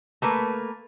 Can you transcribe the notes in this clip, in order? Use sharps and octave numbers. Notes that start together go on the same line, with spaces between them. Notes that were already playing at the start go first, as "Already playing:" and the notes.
A3 A#3 B4